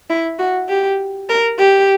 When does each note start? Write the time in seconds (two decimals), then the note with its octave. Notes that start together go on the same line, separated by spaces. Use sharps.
0.10 E4
0.39 F#4
0.69 G4
1.29 A#4
1.59 G4